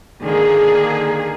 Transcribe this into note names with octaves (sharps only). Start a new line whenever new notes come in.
D3 D#3 A#3 G#4